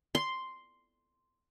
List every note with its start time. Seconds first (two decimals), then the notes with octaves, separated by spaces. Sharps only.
0.15 C6